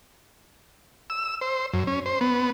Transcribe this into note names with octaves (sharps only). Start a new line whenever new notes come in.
E6
C5
F#2
C#4
C5
B3